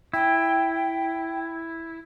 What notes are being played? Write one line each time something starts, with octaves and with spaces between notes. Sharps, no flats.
E4 G5